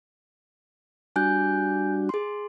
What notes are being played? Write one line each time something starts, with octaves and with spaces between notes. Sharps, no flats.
G3 D4 F#4 G#5 F#6 G6
G#4 C6